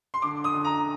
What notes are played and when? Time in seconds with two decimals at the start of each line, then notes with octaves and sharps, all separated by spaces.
0.14 C6
0.22 D3 D6
0.44 D#6
0.54 D3
0.64 A#5